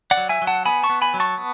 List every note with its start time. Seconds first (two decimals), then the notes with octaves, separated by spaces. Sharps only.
0.11 D5 F#5
0.17 F#3
0.29 E5 G#5
0.42 F#3
0.47 F#5 A5
0.65 B3 G#5 B5
0.83 A5 C#6
0.89 B3
1.02 G#5 B5
1.14 F#3
1.20 A5 C#6
1.38 B3